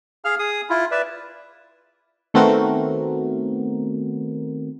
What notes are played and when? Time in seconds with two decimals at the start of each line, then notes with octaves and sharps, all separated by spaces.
0.25 G#4 F5 F6
0.39 G#4 D#6
0.70 E4 F4
0.91 B4 D5 E5
2.34 D#3 A3 B3 C4 F#4 A#4